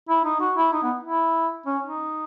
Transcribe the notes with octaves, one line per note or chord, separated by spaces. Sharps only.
E4
D#4
F#4
E4
D#4
B3
E4
C#4
D#4